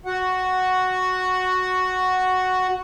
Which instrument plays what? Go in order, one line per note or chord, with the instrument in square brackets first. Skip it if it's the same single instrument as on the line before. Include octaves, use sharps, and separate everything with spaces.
[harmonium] F#4 F#5